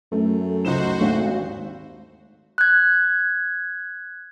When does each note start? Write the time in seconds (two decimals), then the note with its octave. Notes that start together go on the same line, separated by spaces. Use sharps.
0.12 F#2 A3
0.65 C#2 D#4 F#4 C5 E7
1.01 G#1 D#2 A3
2.58 F#6 G#6